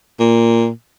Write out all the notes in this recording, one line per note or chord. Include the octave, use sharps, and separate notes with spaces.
A#2